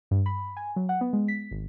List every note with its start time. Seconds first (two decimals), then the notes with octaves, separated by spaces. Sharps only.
0.11 G2
0.26 B5
0.57 G#5
0.76 F#3
0.89 F#5
1.01 B3
1.13 G#3
1.28 B6
1.51 G#1